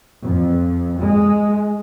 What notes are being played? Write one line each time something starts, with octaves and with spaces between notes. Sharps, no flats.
F2
G#3